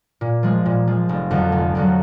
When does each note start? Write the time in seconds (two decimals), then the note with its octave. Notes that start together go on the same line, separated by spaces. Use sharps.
0.21 A#2
0.43 F3 G#3
0.66 A#2
0.87 F3 G#3
1.09 F1
1.31 F2 D3 F#3
1.52 F1
1.75 F2 D3 F#3